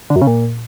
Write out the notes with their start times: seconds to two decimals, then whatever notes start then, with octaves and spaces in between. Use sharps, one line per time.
0.10 D3
0.16 F#2
0.22 C#3
0.27 A#2